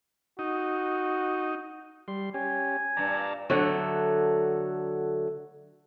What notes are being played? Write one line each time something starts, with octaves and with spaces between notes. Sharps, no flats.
D#4 F#4
G3 C6
C#4 G4 G#5
G2 A#2 D5 A5 A#5
D3 F#3 A3